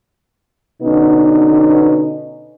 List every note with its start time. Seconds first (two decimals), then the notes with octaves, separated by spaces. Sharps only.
0.82 B2 D3 B3 C#4 D#4